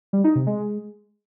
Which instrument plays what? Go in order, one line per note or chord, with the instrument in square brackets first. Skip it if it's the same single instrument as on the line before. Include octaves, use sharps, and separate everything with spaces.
[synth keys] G3
D#4
C3
G#3